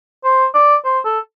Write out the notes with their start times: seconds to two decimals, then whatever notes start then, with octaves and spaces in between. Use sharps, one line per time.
0.24 C5
0.54 D5
0.84 C5
1.05 A4